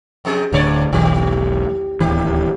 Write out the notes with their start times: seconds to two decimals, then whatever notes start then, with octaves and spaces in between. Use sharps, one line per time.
0.25 F2 C3 G#4
0.52 D1 G2 D3 C#5 D5
0.93 E1 B1 D#3 G4
2.00 D1 D#2 E3 G4